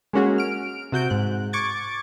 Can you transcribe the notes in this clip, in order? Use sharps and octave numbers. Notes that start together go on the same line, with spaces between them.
G#3 A#3 C#4 F#4 G#4
F6 D7
C3 F#4 G6 D7
G#2 F#6
C#6 D6 G#6 A6